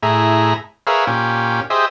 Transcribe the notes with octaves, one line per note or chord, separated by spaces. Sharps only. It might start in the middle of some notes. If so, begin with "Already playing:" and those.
A2 E4 G#4 A#5
G#4 A#4 B4 C#5 E5 F5
A#2 C#4 G4
G4 G#4 C5 D#5 E5